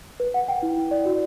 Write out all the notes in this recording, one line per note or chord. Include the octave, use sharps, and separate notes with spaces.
B4
F#5
G5
E4
E4
D5
F#4